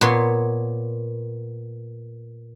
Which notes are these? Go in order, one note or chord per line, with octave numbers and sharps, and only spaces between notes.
A#2 B3 C#5 C6